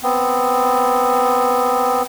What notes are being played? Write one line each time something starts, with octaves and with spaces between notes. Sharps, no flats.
B3 C4